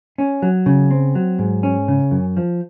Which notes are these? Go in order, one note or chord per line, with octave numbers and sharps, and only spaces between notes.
C#4
F#3
C#3
C4
F#3
G#2
C#4
C#3
F#2
F3